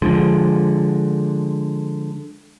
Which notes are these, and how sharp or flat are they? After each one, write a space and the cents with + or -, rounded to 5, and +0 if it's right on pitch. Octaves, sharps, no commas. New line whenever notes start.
D3 +0 F3 +0 G#3 +0